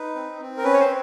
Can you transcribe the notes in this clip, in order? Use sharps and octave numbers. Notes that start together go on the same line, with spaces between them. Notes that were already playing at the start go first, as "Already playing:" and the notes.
Already playing: D#4 B4
C4
C4
A#4
C#4 B4
C#5
C5